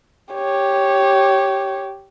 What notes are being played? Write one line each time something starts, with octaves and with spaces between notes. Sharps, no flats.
G4 C#5